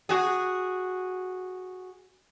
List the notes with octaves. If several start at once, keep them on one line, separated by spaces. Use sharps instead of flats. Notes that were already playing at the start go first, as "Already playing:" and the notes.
F#4 G#4